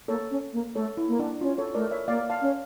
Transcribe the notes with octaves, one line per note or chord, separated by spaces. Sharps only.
A#3 A4 C#5
C#4
A#3
A3 A4 C#5
E4
A#3
D4
C#4 F4
A4 C#5
A3 A#4 D5
C#5 E5
A#3 D5 F5
F5 A5
C#4